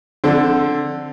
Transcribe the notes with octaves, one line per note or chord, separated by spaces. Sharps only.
D3 C4 A4